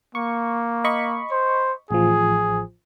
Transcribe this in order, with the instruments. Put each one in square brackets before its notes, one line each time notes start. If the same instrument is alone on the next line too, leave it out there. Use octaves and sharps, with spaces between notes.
[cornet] A#3 [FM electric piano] C#6
[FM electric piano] D#5 B5 C#6
[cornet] C5
[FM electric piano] A1 F3 [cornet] G#4